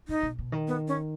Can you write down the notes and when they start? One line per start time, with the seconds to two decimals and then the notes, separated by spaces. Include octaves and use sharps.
0.08 A2 D#4
0.23 B2
0.39 B2
0.52 D#3
0.67 B3
0.88 C#4